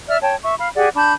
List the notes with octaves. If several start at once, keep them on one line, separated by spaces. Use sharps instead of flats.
D5 E5 F6
C#5 G5 A5
E5 C#6
F5 B5
G4 G#4 D5 F#5
D4 A5 B5 G6